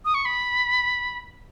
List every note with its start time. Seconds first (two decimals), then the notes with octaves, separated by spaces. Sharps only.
0.05 D#6
0.14 C#6
0.25 B5